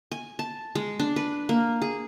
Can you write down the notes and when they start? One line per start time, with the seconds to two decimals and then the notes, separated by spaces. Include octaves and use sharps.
0.11 G#5
0.39 A5
0.75 G#3
1.00 D4
1.16 B4
1.49 A#3
1.82 G#4